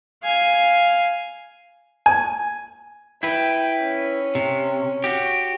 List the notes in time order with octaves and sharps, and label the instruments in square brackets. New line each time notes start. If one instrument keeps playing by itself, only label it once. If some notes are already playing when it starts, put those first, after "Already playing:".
[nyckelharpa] F5 G#5
[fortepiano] G#5
[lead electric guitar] E4 B4 [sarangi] G5
[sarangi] C#4
[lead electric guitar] C3
F#4 G4